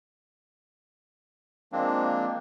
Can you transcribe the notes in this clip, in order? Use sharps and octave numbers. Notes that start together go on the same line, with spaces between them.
F3 G#3 A#3 C4 D4